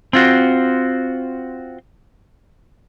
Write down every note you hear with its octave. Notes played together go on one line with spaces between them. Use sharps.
C4 F4 F#4